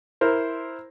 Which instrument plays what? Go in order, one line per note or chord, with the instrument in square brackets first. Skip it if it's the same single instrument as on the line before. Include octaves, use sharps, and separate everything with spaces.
[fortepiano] E4 A#4 C5